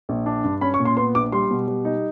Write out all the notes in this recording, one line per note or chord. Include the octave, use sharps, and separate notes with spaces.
A#1
D4
G2
C#4 B5
C#6
A#2
C6
B3 C6
A#1 D6
G3 C6
B2
G3
D#4